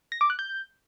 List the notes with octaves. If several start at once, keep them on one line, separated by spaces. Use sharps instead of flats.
A#6
D6
F#6
G6